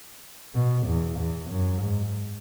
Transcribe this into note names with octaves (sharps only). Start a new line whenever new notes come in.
B2
E2
E2
F#2
G#2